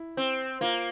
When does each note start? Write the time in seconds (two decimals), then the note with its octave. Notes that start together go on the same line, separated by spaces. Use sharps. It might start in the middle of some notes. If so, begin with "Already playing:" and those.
Already playing: E4
0.17 C4
0.61 A#3 F4